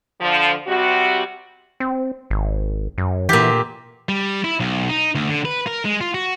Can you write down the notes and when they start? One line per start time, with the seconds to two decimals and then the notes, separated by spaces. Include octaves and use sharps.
0.21 D3 F3
0.67 C3 G3 C4 F#4
1.80 C4
2.30 G#1
2.98 F#2
3.29 A#2 E3 G4
4.09 G3
4.44 E4
4.60 B1
4.89 D#4
5.15 D2
5.29 D3
5.45 B4
5.67 A#4
5.85 G#3
6.01 F4
6.14 F#4